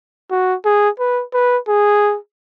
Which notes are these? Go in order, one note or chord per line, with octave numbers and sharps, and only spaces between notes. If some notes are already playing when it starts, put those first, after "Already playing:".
F#4
G#4
B4
B4
G#4